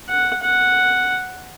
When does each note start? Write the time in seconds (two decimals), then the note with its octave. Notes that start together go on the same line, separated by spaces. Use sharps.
0.09 F#5
0.43 F#5